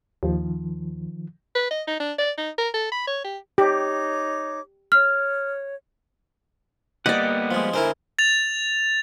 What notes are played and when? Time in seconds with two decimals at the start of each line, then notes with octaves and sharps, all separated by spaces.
0.23 D#2 D#3 F3
1.55 B4
1.70 D#5
1.87 D#4
2.00 D4
2.18 D5
2.38 D#4
2.58 A#4
2.74 A4
2.92 B5
3.07 C#5
3.24 G4
3.58 D#4 G4 C#5 D6
4.92 C#5 F6
7.06 G3 A#3 B3 G4 D5 D#5 F#5
7.51 F3 G#3
7.74 D3 E4 A#4 C5 G#5
8.19 A6 F7